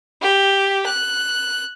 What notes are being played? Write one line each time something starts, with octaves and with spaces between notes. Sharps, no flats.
G4
F#6